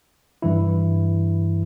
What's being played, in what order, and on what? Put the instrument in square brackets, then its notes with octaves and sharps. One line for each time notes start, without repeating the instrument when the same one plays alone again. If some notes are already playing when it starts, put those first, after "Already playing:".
[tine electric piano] G2 E3 E4